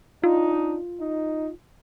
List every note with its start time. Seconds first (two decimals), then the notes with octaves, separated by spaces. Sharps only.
0.24 D4 D#4 F4
1.00 D#4